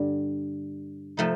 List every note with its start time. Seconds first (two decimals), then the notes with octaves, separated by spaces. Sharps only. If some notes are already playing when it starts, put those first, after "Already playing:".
Already playing: G2 D3 G3
1.17 C3 F3 A3 D#4